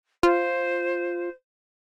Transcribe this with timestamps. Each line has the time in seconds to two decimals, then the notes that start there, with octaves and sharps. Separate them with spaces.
0.23 F4 C5